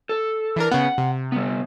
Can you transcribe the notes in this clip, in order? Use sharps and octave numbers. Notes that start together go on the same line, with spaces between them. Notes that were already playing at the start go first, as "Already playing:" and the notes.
A4
E3 D4 A#4
C#3 B3 F#5
C3
G3 B3